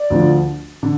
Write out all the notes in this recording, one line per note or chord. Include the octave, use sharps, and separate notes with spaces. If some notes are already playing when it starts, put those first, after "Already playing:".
Already playing: D5
D2 D3 F3
D3